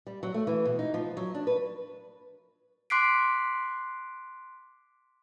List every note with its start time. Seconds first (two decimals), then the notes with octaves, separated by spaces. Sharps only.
0.07 G3
0.23 F#3
0.34 A3
0.47 E3
0.65 B2
0.79 D#4
0.94 F3
1.17 F#3
1.34 D4
1.47 B4
2.90 C6 D6 F#6 B6 C7 D7